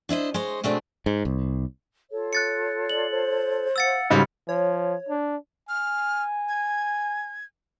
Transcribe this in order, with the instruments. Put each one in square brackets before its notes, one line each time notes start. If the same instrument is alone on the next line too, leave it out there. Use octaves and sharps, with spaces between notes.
[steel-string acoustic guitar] D4 E4 C5 D#5
G#3 C5 C#5 D#5
B2 G#3 A3 C4 D4
[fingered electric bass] G#2
C2
[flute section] F4 A4 C#5
[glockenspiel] F#6 A6 C#7
[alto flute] D5 [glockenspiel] F#7
[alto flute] C5
[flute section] F5 F#5 [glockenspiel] E6 A6 C#7
[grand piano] G#2 C#3 G3 [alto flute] F#4 [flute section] C#5 C6
[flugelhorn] F3 [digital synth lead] C#5
[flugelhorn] D4
[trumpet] G#5 [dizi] F6
[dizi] G#6